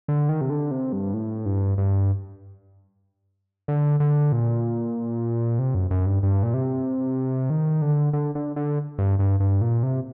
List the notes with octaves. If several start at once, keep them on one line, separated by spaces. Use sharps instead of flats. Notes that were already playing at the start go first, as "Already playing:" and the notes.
D3
D#3
C3
D3
C3
G2
A2
G2
G2
D3
D3
A#2
C3
F#2
F#2
G2
G2
A#2
C3
D#3
D3
D3
D3
D3
G2
G2
G2
A#2
C3